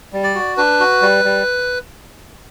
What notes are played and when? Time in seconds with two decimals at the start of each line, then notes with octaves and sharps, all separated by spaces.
0.13 G3
0.24 D5
0.35 F#4
0.57 D4 B4
0.80 F#4
1.02 G3
1.25 G3